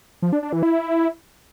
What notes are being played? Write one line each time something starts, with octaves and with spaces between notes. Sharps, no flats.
F3
D4
D4
E3
E4